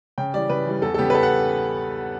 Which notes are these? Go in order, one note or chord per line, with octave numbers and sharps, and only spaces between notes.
C#3 G5
E3 G3 D5
C#3 B4
E3 G3
E2 A4
A4
C#3 G3 B3 G4
B4
A4
F#5